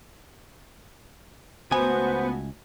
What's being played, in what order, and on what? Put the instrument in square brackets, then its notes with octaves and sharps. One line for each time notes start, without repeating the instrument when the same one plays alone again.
[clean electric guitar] C#2 G#5 [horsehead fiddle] A3 F#4 [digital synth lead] B3 [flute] C5